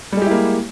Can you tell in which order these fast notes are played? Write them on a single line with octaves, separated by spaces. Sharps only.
G3 G#3 G4 E4 A#3